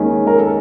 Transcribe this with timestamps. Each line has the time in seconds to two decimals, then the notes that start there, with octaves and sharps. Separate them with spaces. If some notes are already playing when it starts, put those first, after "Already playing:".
Already playing: D#2 D#3 G#3 C#4
0.27 A#4
0.38 A4